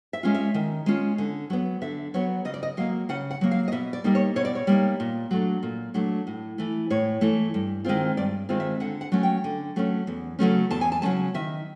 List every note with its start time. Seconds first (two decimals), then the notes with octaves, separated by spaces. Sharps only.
0.13 E5
0.23 G#3 C#4 F4
0.34 E5
0.54 D#3
0.86 G#3 C#4 F4
1.18 D3
1.50 F#3 B3
1.82 D3 E5
2.14 F#3 B3 C#5
2.45 C#3 D#5
2.54 D5
2.63 D#5
2.77 F#3 A#3 F5
3.09 C#3 F#5
3.31 F#5
3.41 F#3 A#3
3.51 F5
3.68 D#5
3.72 B2 E5
3.93 D5
4.04 G3 A#3 D#4
4.15 C#5
4.36 B2 C#5
4.45 D5
4.55 C#5
4.67 G3 A#3 D#4
5.00 A#2
5.31 F#3 A3 D4
5.63 A#2
5.94 F#3 A3 D4
6.27 A2
6.58 E3 A3
6.90 A2 C#5
7.21 E3 A3
7.54 G2
7.85 D#3 G#3 C4 F4
8.17 G2 D5
8.49 D#3 G#3 C4 F4
8.60 E5
8.80 D3 F#5
9.01 F#5
9.12 F#3 A3 C#4
9.23 G5
9.44 D3
9.76 F#3 A3 C#4
10.07 E2
10.39 C#3 F#3 A3 C#4
10.70 E2 A5
10.81 G#5
10.92 A5
11.02 C#3 F#3 A3 C#4 A5
11.34 D#3 E5